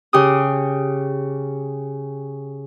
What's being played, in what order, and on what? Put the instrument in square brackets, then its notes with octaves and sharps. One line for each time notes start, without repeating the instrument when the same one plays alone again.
[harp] C#3 G4 D#6